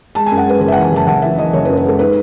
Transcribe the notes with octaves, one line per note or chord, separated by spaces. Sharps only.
G#3 A5
G#5
F#2
F#5
G#3 B4
F#1 B4
E5
F#5
E3
G#5
F#1 A5
F#1 F#5
E3 E5
E3 D#5
F#1 C#5
B4
F#2
B4
G#3 A4
D#4 B4